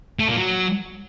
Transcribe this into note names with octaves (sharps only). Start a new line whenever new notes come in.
A3
A#2
F#3